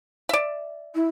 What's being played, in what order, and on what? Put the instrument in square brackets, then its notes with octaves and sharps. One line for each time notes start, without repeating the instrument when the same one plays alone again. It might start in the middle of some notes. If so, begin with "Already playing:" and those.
[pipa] D5 E5
[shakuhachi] E4